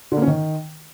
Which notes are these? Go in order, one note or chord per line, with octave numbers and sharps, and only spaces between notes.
D3
A#3
C#4
D#3